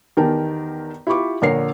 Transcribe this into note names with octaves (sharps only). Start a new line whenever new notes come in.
E2 D#3 G4 A#4 G5 A5
E4 F4 G4 B5 C#6 D6
A#1 D3 A#4 C#5 C7